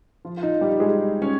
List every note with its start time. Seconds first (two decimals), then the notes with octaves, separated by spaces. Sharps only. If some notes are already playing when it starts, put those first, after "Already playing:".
0.25 F3 F4
0.37 F4
0.43 D#4
0.61 G3 G4
0.80 G#3 G#4
1.22 C#4 C#5